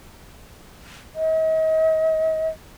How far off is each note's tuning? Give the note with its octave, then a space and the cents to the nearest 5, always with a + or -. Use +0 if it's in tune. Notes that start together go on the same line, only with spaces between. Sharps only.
D#5 +40